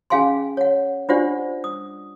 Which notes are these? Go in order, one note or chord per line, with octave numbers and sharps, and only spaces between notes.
C#4 G#4 F5 G#5 C6
C#5 F#5
D4 F4 G4 C5 D5 F#5
D#6